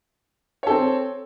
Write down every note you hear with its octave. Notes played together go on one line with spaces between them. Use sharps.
C4 A4 C#5